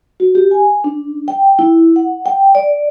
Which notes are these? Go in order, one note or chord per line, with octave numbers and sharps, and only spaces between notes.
F#4
G4
G#5
D4
G5
E4
F#5
G5
D5